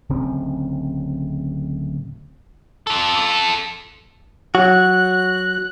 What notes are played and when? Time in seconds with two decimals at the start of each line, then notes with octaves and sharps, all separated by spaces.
0.09 D1 C#3 C4
2.87 F4 A4
4.55 F#3 F#4 F#6